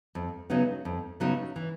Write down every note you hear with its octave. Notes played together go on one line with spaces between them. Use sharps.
F2
C#3 F#3 B3 D#4
F2
C#3 F#3 B3 D#4
E3